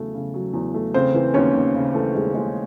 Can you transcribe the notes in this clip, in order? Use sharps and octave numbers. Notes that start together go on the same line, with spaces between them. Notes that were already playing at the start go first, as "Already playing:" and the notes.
Already playing: E2 C#3 F#3 A3
C#3
F#3
E2
A3
C#3 C4 C5
E3
D#2 C#4 C#5
D#2
C#3
E3 A3 A4
D#2 G#3 G#4
D#2 G#3 G#4